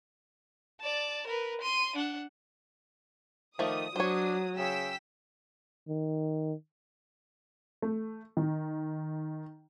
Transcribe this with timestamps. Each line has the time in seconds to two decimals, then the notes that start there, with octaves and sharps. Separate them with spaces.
0.80 D5 A5
1.27 A#4 B4
1.61 C6 D#7
1.96 D4 F#5
3.59 D#3 F3 A3 D5 D#6
3.96 F#3 D4 C5 C#5
4.57 C#3 G5 E6 B6
5.89 D#3
7.82 A3
8.37 D#3